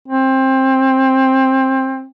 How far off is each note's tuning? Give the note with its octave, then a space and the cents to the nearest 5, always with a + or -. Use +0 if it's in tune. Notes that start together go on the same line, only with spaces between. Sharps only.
C4 +20